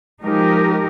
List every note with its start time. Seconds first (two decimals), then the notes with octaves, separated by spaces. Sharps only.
0.22 F3 G#3 D#4 G4 A#4